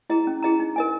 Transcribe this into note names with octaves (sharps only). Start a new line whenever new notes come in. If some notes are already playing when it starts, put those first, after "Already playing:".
E4 G#4 D#5 A#5
C#4
E4 G#4 D#5 A#5
D#4
A#4 D#5 G#5